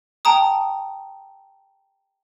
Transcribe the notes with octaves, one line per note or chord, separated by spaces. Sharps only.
G5 A5 A#5 D#6